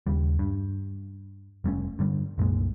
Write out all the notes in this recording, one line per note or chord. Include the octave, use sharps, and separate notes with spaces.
D#2 C#3 G3
G2
F1 G3 A3 C#4
G2 D3 G3
C2 F#2 A#2 G#3